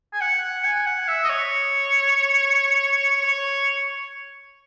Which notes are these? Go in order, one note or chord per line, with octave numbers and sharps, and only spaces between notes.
G#5
F#5
G#5
F#5
E5
D#5
C#5
C#5